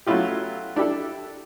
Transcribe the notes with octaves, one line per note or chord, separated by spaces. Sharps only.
F#3 A3 C#4 E4 F4 G4
D4 E4 G4 A4